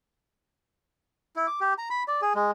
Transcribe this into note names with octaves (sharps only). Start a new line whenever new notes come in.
E4
D6
G4
A#5
B5
D5
G#4
G#3